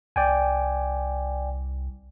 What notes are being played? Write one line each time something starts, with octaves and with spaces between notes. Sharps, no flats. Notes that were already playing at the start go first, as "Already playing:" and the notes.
C2 D5 G5 G#5